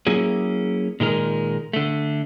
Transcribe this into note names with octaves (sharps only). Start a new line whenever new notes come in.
F#3 A#3 C#4 E4 G#4
A#2 D#3 G#3 A#4
D3 A3